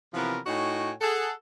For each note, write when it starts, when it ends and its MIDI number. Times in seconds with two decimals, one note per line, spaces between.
0.14 0.38 48
0.14 0.38 52
0.14 0.38 53
0.14 0.38 59
0.14 0.38 61
0.14 0.38 70
0.46 0.92 45
0.46 0.92 63
0.46 0.92 66
0.46 0.92 73
0.46 0.92 79
0.46 0.92 80
1.01 1.31 68
1.01 1.31 69
1.01 1.31 78